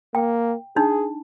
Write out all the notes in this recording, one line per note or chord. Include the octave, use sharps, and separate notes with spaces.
A#3 G5
D4 D#4 G#4